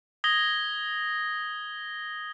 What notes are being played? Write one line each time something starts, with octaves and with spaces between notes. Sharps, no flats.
D#6 G#6 A#6 G7